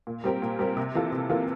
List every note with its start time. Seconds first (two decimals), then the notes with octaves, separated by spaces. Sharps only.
0.07 A#2
0.24 G3 C4 G4 A#4
0.42 A#2
0.59 G3 C4 G4 A#4
0.77 C3
0.95 E3 A#3 F4 A4
1.12 C3
1.29 E3 A#3 F4 A4